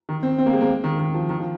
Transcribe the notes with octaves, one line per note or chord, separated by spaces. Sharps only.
D#3
C4
C4
A#3
G#3
A#3
D#3
D#3
F3
D#3
F3